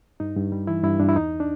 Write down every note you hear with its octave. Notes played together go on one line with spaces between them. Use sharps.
G2 D#4
G2
G3
E3 E4
G2 E4
G2 D4
E4
E2 D#4
D4